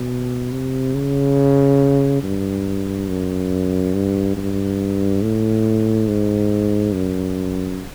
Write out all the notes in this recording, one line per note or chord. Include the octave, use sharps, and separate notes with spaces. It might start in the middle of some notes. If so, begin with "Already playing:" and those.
Already playing: B2
C3
C#3
G2
F#2
G2
G2
A2
G#2
F#2